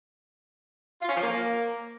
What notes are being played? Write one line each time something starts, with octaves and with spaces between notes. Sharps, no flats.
F4
C#4
F3
A#3